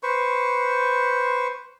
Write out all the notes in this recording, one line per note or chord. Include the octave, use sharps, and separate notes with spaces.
B4 C5 C#6